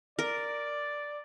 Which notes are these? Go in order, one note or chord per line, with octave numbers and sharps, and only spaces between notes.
A#4 D5